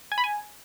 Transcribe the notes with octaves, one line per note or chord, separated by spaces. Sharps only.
G#5
B5
G#5